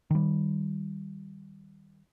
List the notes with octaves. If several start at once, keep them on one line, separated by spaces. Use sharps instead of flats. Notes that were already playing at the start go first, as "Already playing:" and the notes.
D#3 G3